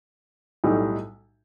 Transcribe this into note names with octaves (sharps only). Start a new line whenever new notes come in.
B1 A2 G3 D#4